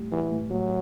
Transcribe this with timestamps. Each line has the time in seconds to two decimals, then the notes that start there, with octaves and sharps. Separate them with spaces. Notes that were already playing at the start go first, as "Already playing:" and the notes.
Already playing: A2 G3
0.11 E3 G3
0.31 A2
0.50 A2 F#3